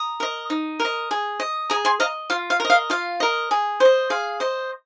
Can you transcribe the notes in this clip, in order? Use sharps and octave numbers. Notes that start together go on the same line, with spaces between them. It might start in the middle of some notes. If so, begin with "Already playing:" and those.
Already playing: A#5 D#6
A#4 D#5
D#4
A#4
D#5
G#4
D#5
G#4 A#5 D#6
G#5 C6
D#5 F5 A#5
F4 F5
F5
A#4 D#5
F5
F4 F5
A#4 D#5
G#4
C5 D#5
G#4 F5
C5 D#5